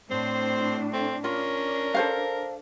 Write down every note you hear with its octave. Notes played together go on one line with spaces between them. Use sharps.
A2 C4 D4 C5
A3 C4
C#4 D4 F4 A#4
A4 C5 F5